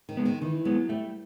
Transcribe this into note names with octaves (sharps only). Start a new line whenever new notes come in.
D#3
G#3 B3
D#3
D#3 E3
F#3 G#3 B3
G3 A3